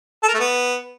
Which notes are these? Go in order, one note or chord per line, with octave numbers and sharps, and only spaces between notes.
A4
A#4
A3
B3